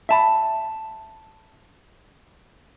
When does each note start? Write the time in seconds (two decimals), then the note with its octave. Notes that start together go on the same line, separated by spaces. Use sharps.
0.09 E5 A5 B5